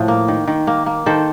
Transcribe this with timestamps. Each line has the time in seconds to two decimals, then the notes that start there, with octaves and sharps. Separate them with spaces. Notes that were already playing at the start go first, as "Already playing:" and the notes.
Already playing: A2 F3
0.08 A#3
0.28 D#3
0.48 D#3
0.67 A#3
0.86 A#3
1.06 D#3 A4 C5